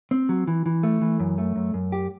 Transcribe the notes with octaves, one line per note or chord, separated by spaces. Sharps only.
C4
F#3
E3
E3
A3
E3
F#2
A3
F#2
F#2
G4